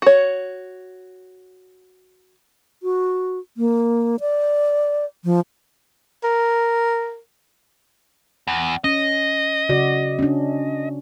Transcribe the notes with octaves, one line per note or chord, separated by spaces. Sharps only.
F#4 C#5
F#4
A#3
D5
F3
A#4
E2
C#4 D#5
C#3 F#4 D5
C#4 D4